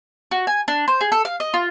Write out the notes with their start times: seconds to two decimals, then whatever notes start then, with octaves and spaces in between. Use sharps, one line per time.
0.31 F#4
0.47 G#5
0.68 D4
0.88 C5
1.01 G#4
1.12 A4
1.25 F5
1.40 D#5
1.54 F4